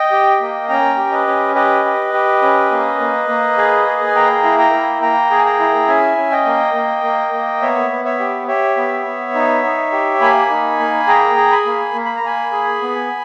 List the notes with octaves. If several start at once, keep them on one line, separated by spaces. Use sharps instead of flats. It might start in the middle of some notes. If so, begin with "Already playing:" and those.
Already playing: D#5 G5
G4
A#3
C#4 G5 A#5
G4
B4 D#5
C#4
G4 B4 D#5
G4
G4
C#4
A#3
A#3
A#3
G#4
G#4
G#5
A#3 G5 A#5
E4
G5 A#5
A#3
A#3 G5 A#5
G#4
G#5
G5 A#5
E4
C#4 E5 G#5
C#4
D#5 G5
A#3
A#3
A#3
A#3
B3 C#5 E5
B3
C#5 E5
G4
G4 C#5 E5
B3
B3
D#4
D#4
G4
A#3 G#5 B5
D#4
A#3
G#4 G5 A#5
G#4
G#5 B5
A#3
A#3
B5
A#5
A#3 G#5 B5
G#4
B3